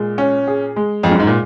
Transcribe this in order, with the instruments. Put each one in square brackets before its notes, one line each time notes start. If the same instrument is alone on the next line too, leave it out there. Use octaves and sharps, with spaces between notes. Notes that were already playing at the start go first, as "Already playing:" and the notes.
Already playing: [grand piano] A#2 [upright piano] G#3
[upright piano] C#4
G#4
G#3
[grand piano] F2 [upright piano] G#3
[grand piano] F#2
G#2
A#2